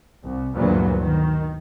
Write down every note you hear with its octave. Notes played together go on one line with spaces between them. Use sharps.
C2
D2 G2 A#2 E3 F#3 B3
D#3